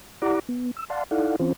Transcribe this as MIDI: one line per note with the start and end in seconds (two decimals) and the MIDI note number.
0.22 0.39 64
0.22 0.39 67
0.22 0.39 74
0.22 0.39 78
0.22 0.39 82
0.22 0.39 86
0.49 0.71 59
0.77 0.85 88
0.90 1.04 74
0.90 1.04 77
0.90 1.04 78
0.90 1.04 81
0.90 1.04 84
1.11 1.36 63
1.11 1.36 64
1.11 1.36 69
1.11 1.36 74
1.11 1.36 77
1.11 1.36 78
1.39 1.53 52
1.39 1.53 60
1.39 1.53 61
1.39 1.53 65
1.39 1.53 72